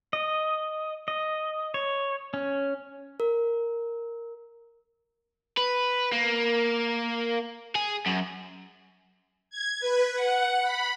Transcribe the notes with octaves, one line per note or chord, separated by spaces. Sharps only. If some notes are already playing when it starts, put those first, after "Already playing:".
D#5
D#5
C#5
C#4
A#4
B4
A#3
G#4
F#2
G#6
B4
F#5
B5